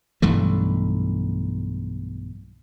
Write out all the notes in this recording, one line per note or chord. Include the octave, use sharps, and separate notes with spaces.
B1 G2 E3 A3